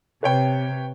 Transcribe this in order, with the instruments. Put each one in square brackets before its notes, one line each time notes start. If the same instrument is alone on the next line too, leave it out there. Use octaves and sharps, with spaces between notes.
[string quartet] C3 [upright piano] B4 C#5 G5